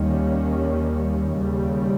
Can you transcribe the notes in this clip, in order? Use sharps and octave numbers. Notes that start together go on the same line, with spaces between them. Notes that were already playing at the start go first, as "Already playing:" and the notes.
Already playing: D#2 D#3 G3 A#3 C#4
D#2 C#3 G3